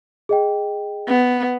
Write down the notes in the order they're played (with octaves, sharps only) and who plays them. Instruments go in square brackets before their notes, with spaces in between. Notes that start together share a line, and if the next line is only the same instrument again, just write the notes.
[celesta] G#4 D#5 G5
[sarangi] B3